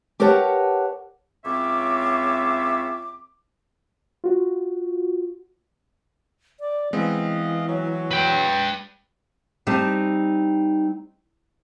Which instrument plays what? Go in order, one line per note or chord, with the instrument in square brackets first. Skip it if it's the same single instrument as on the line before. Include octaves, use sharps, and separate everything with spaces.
[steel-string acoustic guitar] G4 A#4 B4 C#5 F#5 A5
[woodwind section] C#2 C4 F4 C#5 E5 D6
[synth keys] F4 F#4
[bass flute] D5
[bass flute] E3 [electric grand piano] G#3 B3 C4 [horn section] D#5 F5
[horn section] F#3
[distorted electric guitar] B4 G5
[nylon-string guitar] G3 C4 D#4 A5